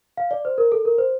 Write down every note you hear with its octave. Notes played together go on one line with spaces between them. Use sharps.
F5
D5
C5
A#4
A4
A#4
C5